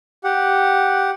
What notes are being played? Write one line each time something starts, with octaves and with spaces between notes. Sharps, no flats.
G4 F#5